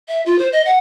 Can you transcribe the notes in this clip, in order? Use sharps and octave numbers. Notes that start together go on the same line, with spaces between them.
E5
F4
C5
D#5
F#5